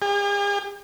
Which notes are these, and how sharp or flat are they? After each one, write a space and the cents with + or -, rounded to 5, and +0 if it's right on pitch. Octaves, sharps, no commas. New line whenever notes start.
G#4 -45